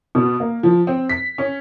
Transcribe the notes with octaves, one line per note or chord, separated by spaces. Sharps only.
B2
A#3
F3
C4
B6
C#4